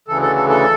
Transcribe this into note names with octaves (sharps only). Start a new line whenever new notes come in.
D2 C#3 E3 A4
A4
A4
A4